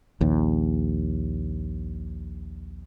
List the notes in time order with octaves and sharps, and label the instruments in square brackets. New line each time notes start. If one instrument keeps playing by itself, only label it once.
[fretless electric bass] A#1 D#2